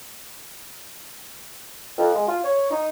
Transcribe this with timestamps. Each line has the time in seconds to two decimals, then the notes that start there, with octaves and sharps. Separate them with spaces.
1.98 F2
2.15 G#3
2.28 F4
2.44 C#5
2.71 D#4